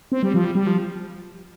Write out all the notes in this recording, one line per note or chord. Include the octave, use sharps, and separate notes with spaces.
C4
G3
F3
G3
G3
F3